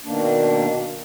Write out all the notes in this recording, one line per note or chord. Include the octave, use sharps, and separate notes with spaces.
B2 D#3 A#3 D4